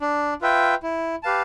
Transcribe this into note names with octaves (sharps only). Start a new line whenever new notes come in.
D4
F4 B4 E5 G5
E4
G4 B4 F5 A5